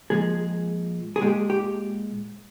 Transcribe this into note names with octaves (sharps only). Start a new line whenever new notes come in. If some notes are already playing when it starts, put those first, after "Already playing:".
A#2 F3 G#3 G#4
G#4
A#2 G#3 G4
G4